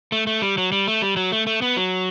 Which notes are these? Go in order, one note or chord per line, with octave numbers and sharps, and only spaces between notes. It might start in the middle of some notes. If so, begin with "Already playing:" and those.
A3
A3
G3
F#3
G3
A3
G3
F#3
A3
A3
B3
F#3